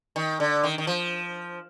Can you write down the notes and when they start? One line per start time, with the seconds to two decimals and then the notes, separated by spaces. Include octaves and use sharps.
0.16 D#3
0.40 D3
0.64 D#3
0.78 D#3
0.87 F3